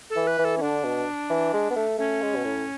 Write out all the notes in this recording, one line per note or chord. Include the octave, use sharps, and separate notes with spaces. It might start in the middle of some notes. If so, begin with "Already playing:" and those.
A4
E3
B4
E3
A4
C#4
D3 D4
B2
E3
G#3
B3
A3
A3 C#4
G#3
B2
A2